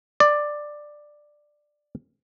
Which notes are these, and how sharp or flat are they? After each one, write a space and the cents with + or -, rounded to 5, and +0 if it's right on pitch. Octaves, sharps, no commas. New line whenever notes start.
D5 +10